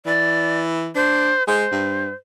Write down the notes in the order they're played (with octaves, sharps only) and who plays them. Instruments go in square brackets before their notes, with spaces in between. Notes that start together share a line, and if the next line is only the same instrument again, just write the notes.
[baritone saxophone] E3 [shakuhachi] D5
[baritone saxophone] D4 [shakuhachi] C5
[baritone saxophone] G#3 [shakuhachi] C5
[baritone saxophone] G2